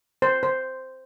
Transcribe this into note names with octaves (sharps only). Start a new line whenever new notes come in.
C5
C5